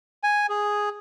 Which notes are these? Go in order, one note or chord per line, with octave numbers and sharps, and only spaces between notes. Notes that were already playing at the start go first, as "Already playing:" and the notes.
G#5
G#4